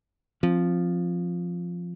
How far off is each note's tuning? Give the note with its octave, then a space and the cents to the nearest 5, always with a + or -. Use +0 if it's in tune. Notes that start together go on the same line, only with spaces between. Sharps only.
F3 +0 C4 +15